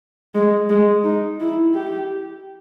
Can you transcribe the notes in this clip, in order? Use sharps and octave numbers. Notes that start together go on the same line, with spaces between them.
G#3
G#3
D#4
E4
G4